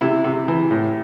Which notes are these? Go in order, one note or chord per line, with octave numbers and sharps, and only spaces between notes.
C3 E4
C3
E3
A2